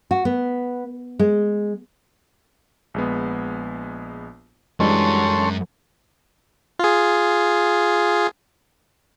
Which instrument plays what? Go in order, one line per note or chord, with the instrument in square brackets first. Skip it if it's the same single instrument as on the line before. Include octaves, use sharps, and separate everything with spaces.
[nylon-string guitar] F#4
B3
G#3
[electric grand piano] A#1 G#3 B3
[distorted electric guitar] F#2 [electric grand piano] E3 G3 D4 [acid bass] G#3 [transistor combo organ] A4 C#5 C6
[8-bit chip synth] F4 G#4